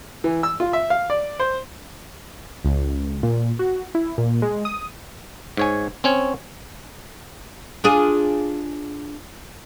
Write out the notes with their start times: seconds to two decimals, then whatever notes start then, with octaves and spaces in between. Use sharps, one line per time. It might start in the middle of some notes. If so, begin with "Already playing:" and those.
0.24 E3
0.43 E6
0.60 F4
0.73 E5
0.90 F5
1.10 D5
1.40 C5
2.65 C#2
3.23 A#2
3.59 F#4
3.95 E4
4.18 A#2
4.42 G#3
4.65 D#6
5.57 G#2 C#5 G#5
6.04 C4 C#4 C#5
7.84 D4 F4 G#4